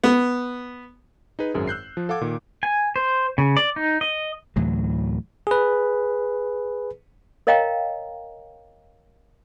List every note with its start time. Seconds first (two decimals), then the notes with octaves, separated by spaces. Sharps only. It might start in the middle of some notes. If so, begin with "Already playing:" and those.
0.04 B3
1.39 D#4 G#4 B4
1.54 G#1 F#2 G#4 A#4
1.68 E6 F#6 G6 C7
1.97 F3
2.09 A4 F5 F#5 D6 G#6
2.21 A#2 D#3
2.63 G#5
2.96 C5
3.38 C#3
3.57 D5
3.76 D#4
4.01 D#5
4.56 D2 A2 E3 F#3
5.47 G#4 B4
7.47 A#4 C#5 D#5 F5 G5 A#5